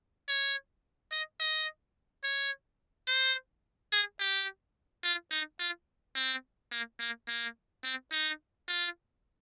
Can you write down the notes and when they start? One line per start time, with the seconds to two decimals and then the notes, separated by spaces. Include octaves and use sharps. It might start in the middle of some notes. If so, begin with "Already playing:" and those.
0.29 C#5
1.12 D#5
1.40 D#5
2.24 C#5
3.08 C5
3.92 G#4
4.20 G4
5.04 F4
5.31 D#4
5.60 F4
6.15 C4
6.72 A#3
7.00 A#3
7.28 A#3
7.84 C4
8.12 D#4
8.69 F4